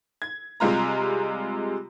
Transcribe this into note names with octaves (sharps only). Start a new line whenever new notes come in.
G#6
C3 G3 G#3 F4 A#5